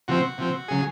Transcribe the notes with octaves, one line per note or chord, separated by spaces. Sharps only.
C3 F3 C4 F#4
C3 F3 C4
C#3 F#3 G#4